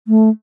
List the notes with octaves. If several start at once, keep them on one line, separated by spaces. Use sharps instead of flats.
A3